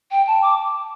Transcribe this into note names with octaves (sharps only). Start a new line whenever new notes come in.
G5
A5
D6